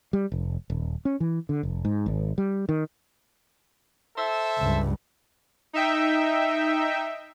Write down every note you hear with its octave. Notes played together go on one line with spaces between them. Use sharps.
G3
F1
D#1
C#4
E3
D3
F1
G#2
G#1
G3
D#3
A4 C5 E5
C#2 G2
D#4 E5 G5